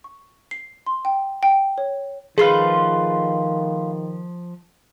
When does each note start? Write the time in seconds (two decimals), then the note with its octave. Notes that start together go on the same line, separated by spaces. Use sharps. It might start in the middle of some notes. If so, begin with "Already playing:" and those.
0.04 C#6
0.51 C7
0.86 C6
1.05 G5
1.43 G5
1.78 C#5
2.38 D#3 F3 A3 F4 G#4 B4 C6 F6